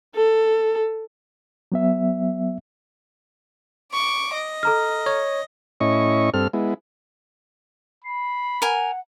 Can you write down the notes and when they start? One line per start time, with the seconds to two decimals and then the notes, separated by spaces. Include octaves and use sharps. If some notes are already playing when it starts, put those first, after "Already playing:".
0.15 A4
1.72 F#3 B3 E5
3.93 C#6 D6
4.34 D#5
4.63 A4 A#5 F6
5.06 C#5
5.81 A2 C#4 E4 D#5 C#6
6.34 G2 C4 A4 F6
6.53 G#3 B3 E4
8.05 B5 C7
8.62 A#4 F#5 G#5